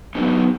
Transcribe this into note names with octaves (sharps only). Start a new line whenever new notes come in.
F#3 B3 D#4 G4